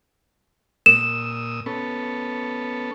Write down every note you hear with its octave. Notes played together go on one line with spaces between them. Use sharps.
A#2 D#6 E6 E7
B3 C#4 A4